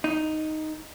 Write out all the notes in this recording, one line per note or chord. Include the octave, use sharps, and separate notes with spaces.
D#4